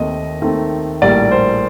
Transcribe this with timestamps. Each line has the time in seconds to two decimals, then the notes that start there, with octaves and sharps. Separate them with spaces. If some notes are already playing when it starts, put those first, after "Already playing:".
Already playing: D#2 D#3 A3 C4 D#5
0.41 D#2 D#3 A3 C4
1.02 A#1 A2 G3 A#3 D5
1.31 C5